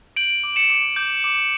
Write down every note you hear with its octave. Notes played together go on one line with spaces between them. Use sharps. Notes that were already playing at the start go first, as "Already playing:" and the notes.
G6 D7 F#7
D6
C#7 E7
D6
D6 G6
D6